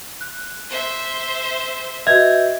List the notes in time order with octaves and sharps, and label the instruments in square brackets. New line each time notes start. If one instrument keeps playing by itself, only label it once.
[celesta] F#6
[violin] C5 E5
[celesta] F#4 B4 D#5 [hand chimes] E5 G6 [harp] G#6